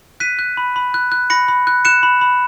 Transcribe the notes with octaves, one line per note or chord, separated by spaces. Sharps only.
F#6 B6 D#7
F#6
B5
B5
F#6
F#6
B5 A#6 C#7
B5
F#6
F#6 C#7 E7
B5
B5